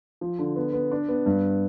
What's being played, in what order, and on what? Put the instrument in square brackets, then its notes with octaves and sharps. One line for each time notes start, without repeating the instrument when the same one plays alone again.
[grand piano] F3
D3
B3
B3
D4
B3
G2